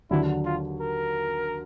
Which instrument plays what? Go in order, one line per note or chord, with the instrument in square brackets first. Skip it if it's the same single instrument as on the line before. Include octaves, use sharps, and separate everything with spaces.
[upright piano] D#2 D3 F#3 [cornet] E4
[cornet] F4
A#4